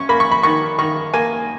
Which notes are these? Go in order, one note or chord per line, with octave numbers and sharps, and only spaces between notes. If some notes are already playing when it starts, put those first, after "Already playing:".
Already playing: C#4 C#6
A#3 B5
C#6
B5
D#3 C#6
D#3 C#6
A#3 G#5